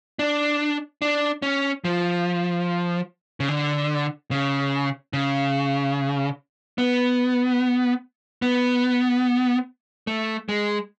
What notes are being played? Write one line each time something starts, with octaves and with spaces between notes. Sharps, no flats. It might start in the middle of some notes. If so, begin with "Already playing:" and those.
D4
D4
C#4
F3
C#3
D3
C#3
C#3
B3
B3
A3
G#3